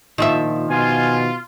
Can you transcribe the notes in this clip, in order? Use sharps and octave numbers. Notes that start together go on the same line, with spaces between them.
A#2 D#3 F3 E5
B2 F4 G#5